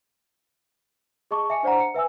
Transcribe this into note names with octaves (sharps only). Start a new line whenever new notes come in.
G#4 D#5 A5 C#6 D6
E5 G#5 C#7
D4 C5 D5 F#5 A#5
C#7
B4 E5 G#5 E6